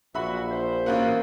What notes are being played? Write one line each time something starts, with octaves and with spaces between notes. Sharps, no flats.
A#1 E3 F#3 F#4 E5 B5
C5
A1 A#3 C#4 F#4